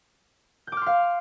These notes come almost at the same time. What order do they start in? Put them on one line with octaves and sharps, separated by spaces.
G6 D6 F6 C6 F5